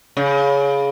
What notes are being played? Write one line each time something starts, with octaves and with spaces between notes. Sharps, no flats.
C#3